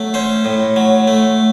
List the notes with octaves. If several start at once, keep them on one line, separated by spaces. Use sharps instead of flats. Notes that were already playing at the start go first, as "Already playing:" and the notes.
Already playing: F#3 A3
C#4 C5
A2
F#3
A3